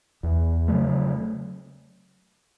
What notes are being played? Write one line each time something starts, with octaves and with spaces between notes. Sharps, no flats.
E2
C#3 F#3 A3